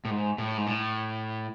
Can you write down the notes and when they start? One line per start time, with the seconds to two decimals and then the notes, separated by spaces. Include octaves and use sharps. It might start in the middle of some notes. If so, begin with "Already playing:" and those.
0.05 A2
0.10 G#2
0.38 A2
0.57 G#2
0.67 A2